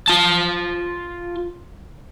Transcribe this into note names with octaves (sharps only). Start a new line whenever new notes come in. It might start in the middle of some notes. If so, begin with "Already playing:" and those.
F4 A5